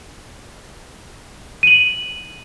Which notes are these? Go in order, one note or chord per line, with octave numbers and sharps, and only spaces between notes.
D#7 F#7